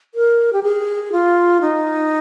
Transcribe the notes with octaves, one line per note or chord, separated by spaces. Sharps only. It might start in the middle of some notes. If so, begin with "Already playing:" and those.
A#4
G4
G#4
F4
D#4